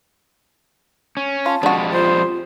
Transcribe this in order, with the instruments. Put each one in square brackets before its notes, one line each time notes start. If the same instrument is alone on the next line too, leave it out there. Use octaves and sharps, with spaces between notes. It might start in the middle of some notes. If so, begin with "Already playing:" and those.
[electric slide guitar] C#4
[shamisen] F4 [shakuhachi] A5
[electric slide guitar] F2 G3 G#3 [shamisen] D4 F#4
[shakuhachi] F4 [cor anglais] C5